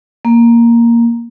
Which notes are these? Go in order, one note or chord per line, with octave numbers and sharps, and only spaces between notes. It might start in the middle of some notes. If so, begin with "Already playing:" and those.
A#3